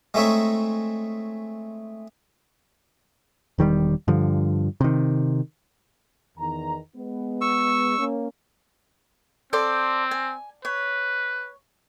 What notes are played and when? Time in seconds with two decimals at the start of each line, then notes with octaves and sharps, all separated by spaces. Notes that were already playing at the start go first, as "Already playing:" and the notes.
0.14 G#3 A3 C4 D#4 C#5 E5
3.58 E1 D#3 F#3 G3
4.08 G2 D3 F3
4.81 C3 D#3
6.38 E2 D#3 A#5
6.95 G#3 B3
7.41 C#6 E6
7.98 A#3 C#4
9.53 C4 A4 C5 D5
10.11 G#5
10.65 B4 C#5